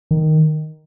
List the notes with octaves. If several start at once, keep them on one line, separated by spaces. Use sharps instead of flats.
D#3